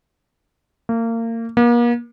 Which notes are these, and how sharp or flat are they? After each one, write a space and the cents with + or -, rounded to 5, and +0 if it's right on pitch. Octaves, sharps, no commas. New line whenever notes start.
A#3 -30
A#3 +40